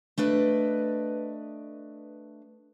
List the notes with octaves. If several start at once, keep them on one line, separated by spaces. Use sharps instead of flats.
A3 D4 B4 D#5